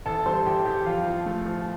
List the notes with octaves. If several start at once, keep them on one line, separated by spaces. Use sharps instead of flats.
A1 A4 A5
G3 C5 C6
A1 G4 G5
A1 G4 G5
F2 F4 F5
F3
A3
F3